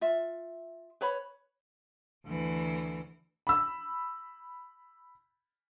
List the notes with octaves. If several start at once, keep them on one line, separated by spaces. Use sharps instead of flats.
F4 E5
B4 C#5 B5
D2 E3
B5 E6